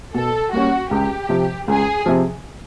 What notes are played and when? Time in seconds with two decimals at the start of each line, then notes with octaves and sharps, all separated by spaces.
0.14 B2 A4
0.53 G3 A#3 C#4 F#4
0.91 C#2 G4
1.29 C3 F3
1.68 C#2 G#4
2.06 C3 F3